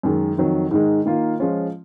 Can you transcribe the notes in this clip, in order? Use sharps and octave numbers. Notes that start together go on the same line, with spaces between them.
F#2 D#3 G#3
F2 D#3 F#3
G#2 D#3 G#3
D#3 A#3 F4
F3 G#3 C#4 F4